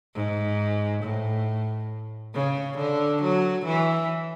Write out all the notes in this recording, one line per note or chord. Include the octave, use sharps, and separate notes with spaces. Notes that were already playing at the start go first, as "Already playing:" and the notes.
G#2
A2
C#3
D3
F#3
E3